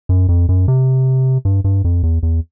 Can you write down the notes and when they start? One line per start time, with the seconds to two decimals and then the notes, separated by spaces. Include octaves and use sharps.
0.09 F#2
0.29 F2
0.49 F#2
0.68 C3
1.45 G2
1.64 G2
1.84 F2
2.03 E2
2.23 E2